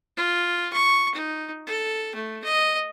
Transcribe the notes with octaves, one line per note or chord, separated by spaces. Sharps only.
F4
C#6
D#4
A4
A3
D#5